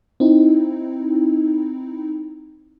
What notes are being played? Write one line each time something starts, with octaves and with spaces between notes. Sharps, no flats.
C4 D#4 E4